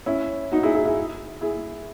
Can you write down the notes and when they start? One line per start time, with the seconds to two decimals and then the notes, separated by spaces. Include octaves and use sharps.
0.06 C#4 E4
0.52 D#4 F#4
0.63 E4 G#4
0.74 E4 G#4
0.85 E4 G#4
1.41 E4 G#4